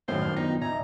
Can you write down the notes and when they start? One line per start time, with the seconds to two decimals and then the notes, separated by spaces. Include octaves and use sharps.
0.08 F#2 A2 D3 D#3 C5 C#5 G#5
0.21 G1 D5 G5 A5 F6
0.36 B3 D#4 F4 G5 A#6
0.62 A#2 D#4 D5 E5 G#5 A#5